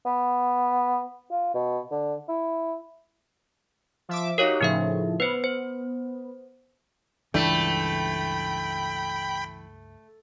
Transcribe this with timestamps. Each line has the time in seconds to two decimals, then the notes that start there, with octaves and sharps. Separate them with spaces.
0.05 B3
1.31 F4
1.55 B2
1.91 D3
2.29 E4
4.09 F3 E5 D6
4.38 D#4 F#4 G4 A#4 C#5 F5
4.61 A2 C#3 F3 D#4 A#4 E5
5.20 B3 B4 C5
5.44 C5
7.34 C#2 G2 E3 A3 D4 G5 B5